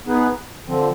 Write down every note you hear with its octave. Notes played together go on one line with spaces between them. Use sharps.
B3 D#4 G#4 B4
D3 F3 C4